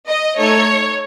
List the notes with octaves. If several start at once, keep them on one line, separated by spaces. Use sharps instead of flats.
D#5
A3 D#4 A4 C#5